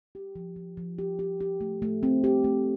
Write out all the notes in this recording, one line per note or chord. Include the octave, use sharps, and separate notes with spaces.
G4
F3
F3
F3
G4
G4
G4
A3
A3
C4
G4
A3